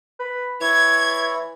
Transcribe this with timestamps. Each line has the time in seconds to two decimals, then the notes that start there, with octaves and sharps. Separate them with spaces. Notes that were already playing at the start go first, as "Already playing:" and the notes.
0.19 B4
0.61 E3 E4 C#5 G#6